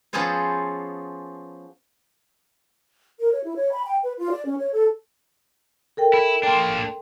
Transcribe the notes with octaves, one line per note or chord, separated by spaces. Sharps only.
F3 B3 C#4 G#4 A4 C5
A#4
C#5
E4
C#5
B5
G5
B4
F4
D5
C#4
C#5
A4
A4 A#4 G5
E4
A#3 D4 G5 A#5 C6